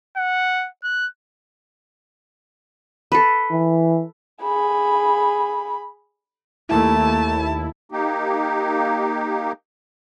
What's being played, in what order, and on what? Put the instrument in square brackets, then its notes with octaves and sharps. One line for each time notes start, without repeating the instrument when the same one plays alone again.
[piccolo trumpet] F#5
F#6
[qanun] A4 B4
[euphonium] E3
[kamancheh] G#4 B5
[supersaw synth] D#2 E4 [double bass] A3 A#3 [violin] A5
[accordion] A#3 D#4 G4